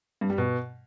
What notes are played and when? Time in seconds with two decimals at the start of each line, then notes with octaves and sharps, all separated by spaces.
0.21 G2
0.30 G3
0.38 B2